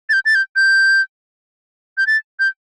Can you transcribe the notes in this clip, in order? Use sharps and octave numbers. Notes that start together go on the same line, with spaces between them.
A6
G6
A6
G6
G6
G6
A6
G6